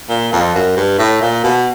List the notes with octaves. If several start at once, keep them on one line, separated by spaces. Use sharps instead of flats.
A#2
F2
F#2
G2
A2
A#2
B2